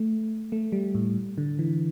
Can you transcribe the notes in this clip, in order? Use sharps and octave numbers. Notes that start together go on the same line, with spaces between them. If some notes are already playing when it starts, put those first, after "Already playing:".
Already playing: A3
A3
G3
A2
D3
E3